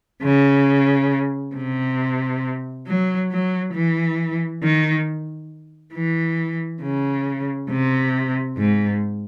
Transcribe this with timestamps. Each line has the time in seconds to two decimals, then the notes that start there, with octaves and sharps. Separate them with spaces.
0.22 C#3
1.55 C3
2.87 F#3
3.31 F#3
3.74 E3
4.63 D#3
5.94 E3
6.82 C#3
7.70 C3
8.57 G#2